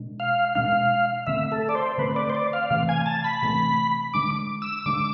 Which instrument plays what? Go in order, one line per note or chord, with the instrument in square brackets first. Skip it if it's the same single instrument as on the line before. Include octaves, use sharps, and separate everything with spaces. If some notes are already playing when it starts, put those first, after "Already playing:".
Already playing: [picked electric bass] B2 G#3 D4
[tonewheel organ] F5
[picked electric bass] B2 G#3 D4 [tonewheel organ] F5
[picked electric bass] D3 A3 C4 [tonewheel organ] E5
[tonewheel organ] A4
D5
C5
[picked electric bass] D3 A3 C4 [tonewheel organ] B4
[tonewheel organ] D5
C5
D5
F5
[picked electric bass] C3 E3 A3 C4 [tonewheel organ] F5
[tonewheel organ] G#5
A5
B5
[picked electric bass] C3 E3 A3 C4
[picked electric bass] D3 G#3 D4 [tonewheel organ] D6
[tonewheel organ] E6
[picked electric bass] D3 G#3 D4 [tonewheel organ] D6